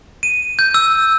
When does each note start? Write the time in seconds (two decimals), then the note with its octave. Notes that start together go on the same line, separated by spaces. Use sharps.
0.23 D#7
0.59 G6
0.74 E6